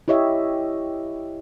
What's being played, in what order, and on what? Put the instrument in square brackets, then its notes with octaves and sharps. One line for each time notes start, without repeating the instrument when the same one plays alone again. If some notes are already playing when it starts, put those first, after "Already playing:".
[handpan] E4 G4 C#5 D#5 E5